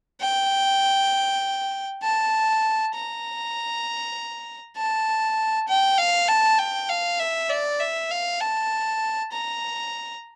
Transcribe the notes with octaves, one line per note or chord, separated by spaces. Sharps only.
G5
A5
A#5
A5
G5
F5
A5
G5
F5
E5
D5
E5
F5
A5
A#5